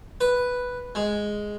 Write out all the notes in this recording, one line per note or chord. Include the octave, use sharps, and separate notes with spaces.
B4
G#3